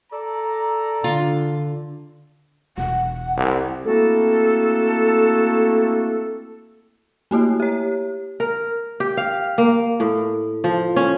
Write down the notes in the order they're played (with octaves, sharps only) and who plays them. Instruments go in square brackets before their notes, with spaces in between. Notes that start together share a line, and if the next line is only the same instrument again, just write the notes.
[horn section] A4 D5 A#5
[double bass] D3 [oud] F4
[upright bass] E1 [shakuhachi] F#5
[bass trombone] C2
[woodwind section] A3 A#3 C4 E4 F#4 A4
[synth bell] A3 A#3 E4 F#4
G4 C#5
[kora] A#4
G4
F5
A#3
A2
F3
C#4